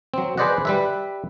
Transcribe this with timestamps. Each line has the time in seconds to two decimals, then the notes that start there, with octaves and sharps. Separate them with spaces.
0.14 F#3 C4
0.37 G#4 B4 C5 D5 D#5 F#5
0.65 G3 B4 E5